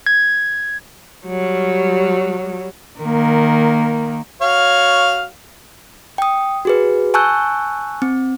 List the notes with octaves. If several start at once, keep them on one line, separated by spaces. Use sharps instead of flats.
G#6
F#3 G3
D#3 A#3
F#4 C#5 F5
G5 D#6
F#4 G#4 B4
G#5 A5 C#6 E6 F#6 G6
C4